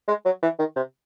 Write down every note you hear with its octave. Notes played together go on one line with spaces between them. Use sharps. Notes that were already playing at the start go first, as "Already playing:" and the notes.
G#3
F#3
E3
D#3
C3